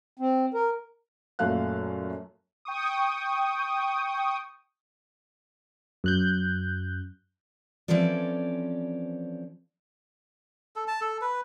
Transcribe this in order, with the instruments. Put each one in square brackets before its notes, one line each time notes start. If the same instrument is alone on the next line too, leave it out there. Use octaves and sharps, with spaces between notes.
[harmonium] C4
A#4
[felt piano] F#2 A#2 A3 F5 F#6
[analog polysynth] G5 C#6 D#6
[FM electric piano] F#2 F#6 G6
[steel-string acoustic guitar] E3 F3 C4 C#4 A4 D5
[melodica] A4
A5
A4
B4